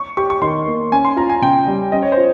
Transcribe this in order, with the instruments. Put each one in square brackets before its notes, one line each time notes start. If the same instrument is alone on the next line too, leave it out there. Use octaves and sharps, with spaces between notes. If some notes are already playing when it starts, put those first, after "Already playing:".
Already playing: [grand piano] C#6
[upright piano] G4 [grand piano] C#6
[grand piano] C#6
[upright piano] D#3 [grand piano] C6
[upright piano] A#3
[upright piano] C#4 [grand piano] G#5
[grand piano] C6
[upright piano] F4 [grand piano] A#5
[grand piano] G#5
[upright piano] C#3 [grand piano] G5
[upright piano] G3
[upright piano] C#4 [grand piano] D#5
[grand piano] C#5
C5
[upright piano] F4